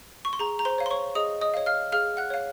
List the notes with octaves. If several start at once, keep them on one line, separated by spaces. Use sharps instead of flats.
C#6
C6
G#4 A#5
A#5
C5 C6
C#5 F5
C6
C#5 C#6
G#4 D#5 D#6
D#5 D#6
C#5 F5
F5 F6
G#4 F5 F6
F#5 F#6
C#5 F5